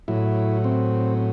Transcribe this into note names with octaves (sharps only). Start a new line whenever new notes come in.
A2 F#3 E4
C4